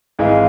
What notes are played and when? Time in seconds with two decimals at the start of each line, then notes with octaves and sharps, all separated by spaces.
0.19 G#1 G#2 E3 G#3 F5